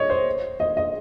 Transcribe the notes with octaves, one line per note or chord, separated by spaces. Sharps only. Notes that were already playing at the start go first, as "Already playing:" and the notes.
Already playing: C#5 D#5
C5
D#5
D#5